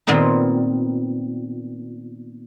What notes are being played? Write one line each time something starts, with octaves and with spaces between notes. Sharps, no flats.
A#2 D#3 B3 C4 D#4